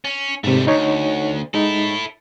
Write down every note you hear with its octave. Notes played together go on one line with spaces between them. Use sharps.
C#4
G#2 C3 G3 A3
D2 D#4 C#5
G#3 D#4 E4 A4